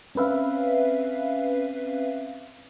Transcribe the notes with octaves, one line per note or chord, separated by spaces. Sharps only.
C4 C#4 B4 E5 F5